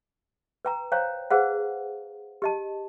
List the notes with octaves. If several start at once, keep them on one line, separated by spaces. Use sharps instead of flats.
B4 G5 A#5
C5 C#5 F5 G5 A#5
G#4 B4 C5 F5 F#5
G4 D#5 A5